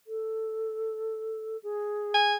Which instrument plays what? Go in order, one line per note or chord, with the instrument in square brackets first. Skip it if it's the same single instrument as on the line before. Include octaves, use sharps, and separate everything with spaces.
[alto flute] A4
G#4
[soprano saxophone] G#5